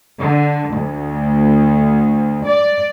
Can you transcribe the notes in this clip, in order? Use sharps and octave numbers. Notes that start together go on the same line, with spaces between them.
D3
D2
D5